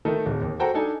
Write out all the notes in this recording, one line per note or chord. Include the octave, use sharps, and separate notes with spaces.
D#3 A3 D#4 A4
D1
D#2
F#4 A4 C5 G5 A#5
D4 D#4 A4 G#5